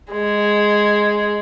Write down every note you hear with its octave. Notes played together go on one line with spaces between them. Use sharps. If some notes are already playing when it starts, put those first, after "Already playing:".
G#3